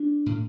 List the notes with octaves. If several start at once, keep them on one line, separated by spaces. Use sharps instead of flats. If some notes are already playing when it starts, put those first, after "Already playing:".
Already playing: D4
A2